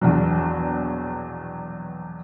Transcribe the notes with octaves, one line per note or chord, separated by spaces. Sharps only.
A#1 E2 B2 F#3